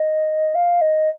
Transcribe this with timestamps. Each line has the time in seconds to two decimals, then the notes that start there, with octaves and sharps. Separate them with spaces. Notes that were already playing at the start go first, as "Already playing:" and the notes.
Already playing: D#5
0.54 F5
0.81 D#5